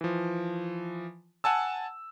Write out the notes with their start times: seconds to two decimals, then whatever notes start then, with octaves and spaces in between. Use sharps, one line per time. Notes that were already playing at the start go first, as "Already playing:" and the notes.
0.01 E3 F3
1.44 F#5 G#5 A5 E6